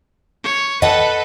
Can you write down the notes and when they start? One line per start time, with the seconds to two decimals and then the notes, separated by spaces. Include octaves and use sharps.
0.44 C#5
0.82 A4 B4 D#5 F#5 A5